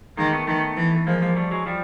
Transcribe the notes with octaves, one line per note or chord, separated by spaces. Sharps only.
D#3 G#3 A#3
A3 B3
D#3 A3 B3
E3
A3
F3 G#3 A#3
G#3 A#3
G3 A3
F#3 G#3
F3 G3